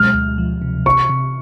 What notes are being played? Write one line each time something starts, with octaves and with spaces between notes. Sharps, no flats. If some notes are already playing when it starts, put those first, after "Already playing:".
Already playing: B2 F#3 G#3 F6
D2
F3
C3
C3 C#6
C3